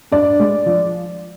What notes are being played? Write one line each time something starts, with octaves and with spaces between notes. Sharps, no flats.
G2 D5
G#3
F3